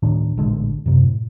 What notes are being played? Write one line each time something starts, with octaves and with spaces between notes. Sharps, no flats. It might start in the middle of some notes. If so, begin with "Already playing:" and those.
D1 A2 D#3 D4
A1 A#2 D3 G#3
F#2 C3
A2